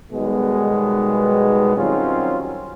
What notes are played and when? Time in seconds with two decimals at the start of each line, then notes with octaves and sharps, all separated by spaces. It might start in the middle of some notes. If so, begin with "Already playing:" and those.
0.12 B1 B2 D#3 G3 G#3 B3
1.76 D#3 F#3 G3 C4 C#4 F4